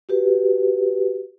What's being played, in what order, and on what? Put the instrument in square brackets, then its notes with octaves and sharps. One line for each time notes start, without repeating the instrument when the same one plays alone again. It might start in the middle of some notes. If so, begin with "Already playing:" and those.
[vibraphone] F#4 G4 B4